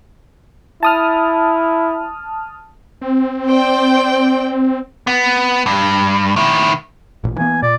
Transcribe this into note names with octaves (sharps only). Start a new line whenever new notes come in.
E4 A5 D#6 F6
C4
C5 D5 G5
B3
G2
D#3 E4
A1 A#2
E3 A#3 B3 G#5
A#2 D5